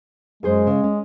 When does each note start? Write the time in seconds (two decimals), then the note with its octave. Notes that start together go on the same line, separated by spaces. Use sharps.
0.43 F#2 G#3 G#4 C5
0.67 C#3
0.83 C#4